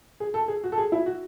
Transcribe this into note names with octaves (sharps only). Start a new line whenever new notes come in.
G#4
A4
G#4
F#4
A4
G#4
E4
F#4